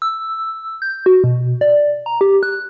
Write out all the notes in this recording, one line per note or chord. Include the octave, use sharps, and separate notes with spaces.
E6
G6
F#4
B2
D5
A#5
G4
F#6